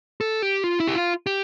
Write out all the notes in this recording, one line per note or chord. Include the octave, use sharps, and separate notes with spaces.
A4
G4
F4
E4
G4
F4
G4